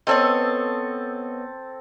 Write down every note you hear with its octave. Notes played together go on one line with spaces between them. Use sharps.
B3 C4 A4 C#5 D#5 A5